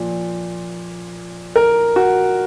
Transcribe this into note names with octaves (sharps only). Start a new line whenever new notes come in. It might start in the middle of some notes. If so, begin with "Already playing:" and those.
Already playing: A#2 F3
A#4
F#4